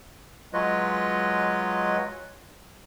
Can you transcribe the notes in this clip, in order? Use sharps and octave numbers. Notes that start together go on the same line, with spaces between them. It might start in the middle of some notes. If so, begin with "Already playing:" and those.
F#3 G#3 F4 B4 C#5 D#5